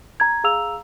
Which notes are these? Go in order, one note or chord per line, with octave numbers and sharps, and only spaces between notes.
A#5 G#6
G#4 F5 A#5 E6 F7